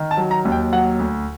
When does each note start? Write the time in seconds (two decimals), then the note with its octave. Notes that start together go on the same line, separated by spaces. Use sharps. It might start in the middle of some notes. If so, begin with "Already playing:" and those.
Already playing: D#3
0.11 A5
0.17 F#3
0.31 A#5
0.45 D#2
0.52 G5
0.73 F#3 F#5
0.99 D2